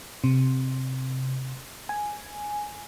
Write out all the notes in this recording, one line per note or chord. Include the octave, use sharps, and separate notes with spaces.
C3
G#5